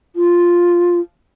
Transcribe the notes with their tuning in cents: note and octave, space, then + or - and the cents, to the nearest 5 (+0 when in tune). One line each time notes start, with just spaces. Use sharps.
F4 +0